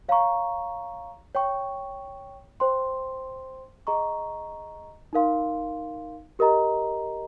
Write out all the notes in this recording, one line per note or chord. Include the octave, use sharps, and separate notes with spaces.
C#5 F5 A#5 C#6
C#5 G5 C#6
C5 G5 C6
G#4 D#5 A#5 C#6
D#4 A#4 F5 C6
G4 A#4 D#5 A#5